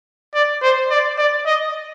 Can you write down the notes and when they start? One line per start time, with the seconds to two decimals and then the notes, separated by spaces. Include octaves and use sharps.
0.34 D5
0.62 C5
0.91 D5
1.18 D5
1.46 D#5